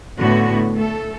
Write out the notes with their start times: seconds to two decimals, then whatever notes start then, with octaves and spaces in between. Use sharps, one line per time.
0.19 A2 D3 B3 F#4
0.76 A3 A4